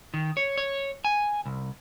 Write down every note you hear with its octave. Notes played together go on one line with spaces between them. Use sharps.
D#3
C#5
C#5
G#5
C2